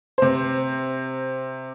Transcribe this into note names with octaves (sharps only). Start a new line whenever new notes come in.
C3 C5